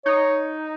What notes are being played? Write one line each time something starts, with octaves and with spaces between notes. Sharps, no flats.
D#4 C#5